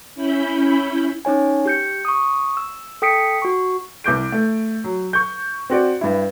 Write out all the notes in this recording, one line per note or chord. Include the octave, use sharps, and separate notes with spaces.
C#4 E4 B5 G6
C#4 D#4 C#5 G#5
G4 G6 C#7
C#6 D#6
E6
A4 G5 D#6 B6 C#7 D7
F#4 C#6
C2 D6 G6 D7
A3
F#3
C#6 G6
C4 F#4 D5
G2 E4